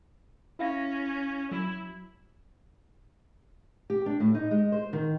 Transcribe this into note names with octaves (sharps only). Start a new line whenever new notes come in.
C#4 E4 F5 A#6
F#3 E4
G4
D4
A2
D#4
G#3
C5
D#3